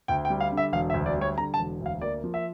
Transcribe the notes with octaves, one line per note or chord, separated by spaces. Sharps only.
D2 G5
G5
G3
F5
D3
E5
E1 F5
E5
D2
D5
G3
C#5
D3 A#5
A5
E1
D2 F5
A#3 D5
F3
E5